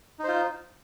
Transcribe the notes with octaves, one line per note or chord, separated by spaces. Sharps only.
D#4 F4 C5